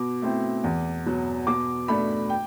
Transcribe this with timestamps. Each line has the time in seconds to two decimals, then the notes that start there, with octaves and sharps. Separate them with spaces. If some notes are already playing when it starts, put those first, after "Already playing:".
Already playing: B2 D6
0.22 A3 C4 E4
0.64 E2
1.06 B2 F#3
1.47 B2 D6
1.88 A3 D4 B5
2.29 G5